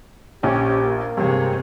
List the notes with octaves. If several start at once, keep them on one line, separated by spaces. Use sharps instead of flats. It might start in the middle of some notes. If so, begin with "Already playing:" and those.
A#1 C#4 G4
A#3
G2 C3 G#3 C4 C#5